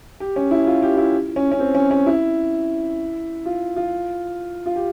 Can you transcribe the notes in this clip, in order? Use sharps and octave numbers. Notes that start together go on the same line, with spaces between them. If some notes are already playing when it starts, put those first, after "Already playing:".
G4
C#4
E4
F4
G4
E4
C#4
C#4
C4
C#4
C#4
E4
F4
F4
F4
G4